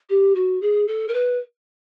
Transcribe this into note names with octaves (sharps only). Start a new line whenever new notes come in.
G4
F#4
G#4
A4
A#4
B4